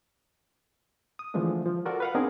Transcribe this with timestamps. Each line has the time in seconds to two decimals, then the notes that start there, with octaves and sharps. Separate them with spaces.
1.19 D#6
1.34 D3 E3 F3 G#3 A3 D4
1.66 F3
1.85 F4 F#4 A4 A#4 D5
2.00 B4 F5 F#5
2.15 B3 C4 D4 D#4 G#4 A#4